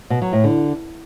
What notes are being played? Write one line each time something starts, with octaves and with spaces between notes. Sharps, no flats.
B2
F#3
A2
D3